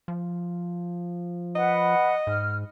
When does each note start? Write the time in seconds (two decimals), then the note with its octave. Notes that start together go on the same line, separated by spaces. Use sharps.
0.08 F3
1.56 B4 D#5 F#5
2.27 G#2 F6